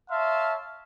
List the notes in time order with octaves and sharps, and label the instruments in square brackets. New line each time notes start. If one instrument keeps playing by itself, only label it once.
[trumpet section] C#5 E5 F5 A5 C6